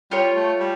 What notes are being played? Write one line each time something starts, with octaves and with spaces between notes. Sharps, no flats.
G3 F4 C#5 G5
A3
G3